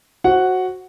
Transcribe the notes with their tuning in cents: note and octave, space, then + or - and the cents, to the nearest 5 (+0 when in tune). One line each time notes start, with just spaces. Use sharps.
F#4 +0 C5 +20 F#5 +0